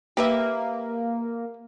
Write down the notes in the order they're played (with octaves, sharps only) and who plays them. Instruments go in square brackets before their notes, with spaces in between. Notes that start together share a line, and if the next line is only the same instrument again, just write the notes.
[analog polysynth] A#3 [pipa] G4 B4 E5